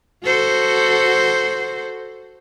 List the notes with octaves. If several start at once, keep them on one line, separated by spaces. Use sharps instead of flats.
F#4 A4 C5